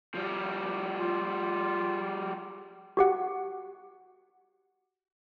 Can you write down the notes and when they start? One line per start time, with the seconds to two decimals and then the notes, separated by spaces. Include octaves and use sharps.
0.15 F3 G3
0.98 F4
2.97 F#4 G4 F#5